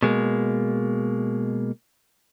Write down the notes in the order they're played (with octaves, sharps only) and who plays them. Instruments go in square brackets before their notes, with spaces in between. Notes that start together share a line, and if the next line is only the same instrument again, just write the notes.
[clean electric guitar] B2 G#3 A#3